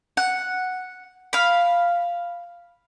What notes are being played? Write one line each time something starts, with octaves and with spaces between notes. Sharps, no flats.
F#5
F5 B5